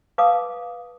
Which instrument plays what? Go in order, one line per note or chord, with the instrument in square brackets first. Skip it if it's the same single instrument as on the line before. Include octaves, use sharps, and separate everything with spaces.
[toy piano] B4 F5 A5 D6 D#6